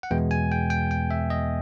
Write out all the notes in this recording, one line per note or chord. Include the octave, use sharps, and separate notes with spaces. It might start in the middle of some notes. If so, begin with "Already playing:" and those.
F#5
E2 B2 G#3 B3 G5
G#5
G5
G5
G5
E5
D#5